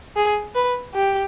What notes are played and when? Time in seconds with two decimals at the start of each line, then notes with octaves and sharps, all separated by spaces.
0.16 G#4
0.55 B4
0.95 G4